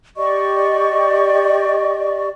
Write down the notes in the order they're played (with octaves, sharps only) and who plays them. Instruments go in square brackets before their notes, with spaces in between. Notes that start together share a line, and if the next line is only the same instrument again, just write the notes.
[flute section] G4 D5 D#5 C#6